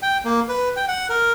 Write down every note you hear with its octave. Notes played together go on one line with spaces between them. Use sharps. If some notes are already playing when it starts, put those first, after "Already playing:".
G5
A#3
B4
G5
F#5
A#4